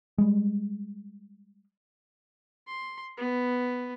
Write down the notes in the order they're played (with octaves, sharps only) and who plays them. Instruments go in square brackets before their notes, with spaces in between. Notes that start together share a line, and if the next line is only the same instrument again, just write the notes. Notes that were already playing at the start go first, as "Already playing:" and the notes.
[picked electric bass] G3 G#3
[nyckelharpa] C6
B3